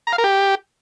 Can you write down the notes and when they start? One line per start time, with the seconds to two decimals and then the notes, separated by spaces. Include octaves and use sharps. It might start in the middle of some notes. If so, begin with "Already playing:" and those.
0.07 A#5
0.13 F5
0.18 A#4
0.24 G4